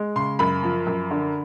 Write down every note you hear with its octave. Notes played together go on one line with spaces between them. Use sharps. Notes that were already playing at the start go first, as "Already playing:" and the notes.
Already playing: G#3
C#3 C6
F#2 B5
F3
F#2
D3